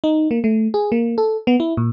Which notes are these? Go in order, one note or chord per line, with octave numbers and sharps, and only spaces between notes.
D#4
A#3
A3
G#4
A#3
A4
B3
E4
A#2